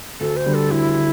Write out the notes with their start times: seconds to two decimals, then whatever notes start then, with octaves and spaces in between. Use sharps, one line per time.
0.20 D2 A4
0.37 C5
0.46 D3 G3
0.54 A4
0.71 D2 E4
0.96 D3